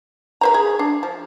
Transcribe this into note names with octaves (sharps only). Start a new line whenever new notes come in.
B4 C5 A#5
G#4
D4
F3